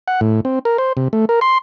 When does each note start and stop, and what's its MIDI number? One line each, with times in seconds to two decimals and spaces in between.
0.08 0.20 78
0.21 0.41 45
0.45 0.59 60
0.65 0.77 70
0.78 0.93 72
0.97 1.08 48
1.13 1.25 57
1.29 1.40 70
1.41 1.58 84